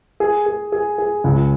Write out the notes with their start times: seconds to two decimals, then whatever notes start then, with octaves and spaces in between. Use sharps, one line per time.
0.20 G#4
0.46 G#4
0.72 G#4
0.98 G#4
1.24 C#2